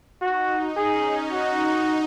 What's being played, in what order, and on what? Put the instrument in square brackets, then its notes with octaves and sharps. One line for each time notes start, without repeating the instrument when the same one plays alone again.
[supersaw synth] D#4 [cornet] F#4
[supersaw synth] C#4 [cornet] G#4
[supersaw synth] D#4 [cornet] F#4